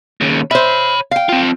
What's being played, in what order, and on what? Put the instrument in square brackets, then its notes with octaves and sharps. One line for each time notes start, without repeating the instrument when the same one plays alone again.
[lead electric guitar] D#2 C#3
[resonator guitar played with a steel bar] C5 E5 [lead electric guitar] C#5 B5
[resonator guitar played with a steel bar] F5 G5
[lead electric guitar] C4 F4